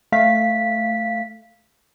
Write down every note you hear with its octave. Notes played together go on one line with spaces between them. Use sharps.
A3 F5 B6